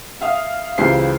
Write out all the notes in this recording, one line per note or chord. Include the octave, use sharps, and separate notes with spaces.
E5 F5 D#6
C#2 C#3 E3 G4 C5 C7